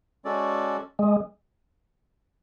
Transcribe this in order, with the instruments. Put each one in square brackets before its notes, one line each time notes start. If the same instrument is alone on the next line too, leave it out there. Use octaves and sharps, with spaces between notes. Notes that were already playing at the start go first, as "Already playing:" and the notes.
[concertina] G#3 C#4 F#4 A4 D5
[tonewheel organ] G#3